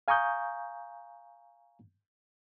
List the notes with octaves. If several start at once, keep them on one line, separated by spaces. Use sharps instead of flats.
F5 G#5 A#5 C#6 D#6 G6